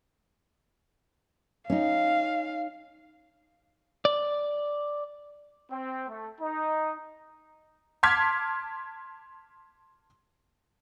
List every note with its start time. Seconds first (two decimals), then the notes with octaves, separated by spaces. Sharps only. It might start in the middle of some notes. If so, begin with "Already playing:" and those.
1.70 C#4 D#4 F5
4.05 D5
5.71 C4
6.08 A3
6.40 D#4
8.03 A5 C6 D6 F6 G#6 B6